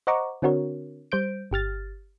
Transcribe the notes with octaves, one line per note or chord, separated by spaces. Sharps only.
C5 D#5 F#5 A#5 C#6 D6
D3 C4 D4 F#4 A#4 C#5
G3 C5 G6 D7
G1 G4 F6 A6